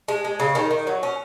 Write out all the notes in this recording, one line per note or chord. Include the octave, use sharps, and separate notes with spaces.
G#3
G#3
C#3
D#3
D#3
F#3
C#4